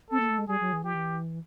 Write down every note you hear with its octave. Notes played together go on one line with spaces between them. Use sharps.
C4 A4
A#3
A3
G#3
G3 G#4
F#3
E3
F3 G4
E3